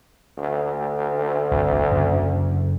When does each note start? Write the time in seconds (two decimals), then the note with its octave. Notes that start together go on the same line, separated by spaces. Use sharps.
0.38 D2
1.51 G1 C2
1.91 F#2 C#3 C#4